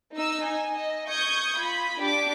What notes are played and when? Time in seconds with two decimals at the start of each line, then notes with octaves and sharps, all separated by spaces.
0.14 D#4 E6
0.44 G#5
0.77 D#5
1.09 C#6 D#6 G6 G#6
1.57 F4 B5
2.00 D4 G4 D6